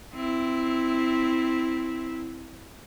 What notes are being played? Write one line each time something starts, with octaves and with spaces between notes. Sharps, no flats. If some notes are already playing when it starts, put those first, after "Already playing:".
C4 E4